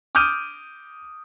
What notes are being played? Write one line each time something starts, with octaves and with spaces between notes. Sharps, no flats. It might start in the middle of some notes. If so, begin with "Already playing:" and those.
D6 D#6 F6 G6 D7 D#7